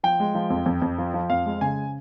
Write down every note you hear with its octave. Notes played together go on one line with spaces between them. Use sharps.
F3 G5
G#3
F3
F2
F2
F2
F3
F3
F2 F5
G#3
C#3 G#5